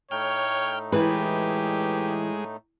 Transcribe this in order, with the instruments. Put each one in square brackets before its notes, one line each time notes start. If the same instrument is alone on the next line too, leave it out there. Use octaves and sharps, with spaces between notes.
[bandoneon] A2 A3 D#4 [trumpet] C#5 [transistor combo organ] G5 F6
[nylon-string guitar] E3 B4 [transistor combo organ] G#3 [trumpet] G4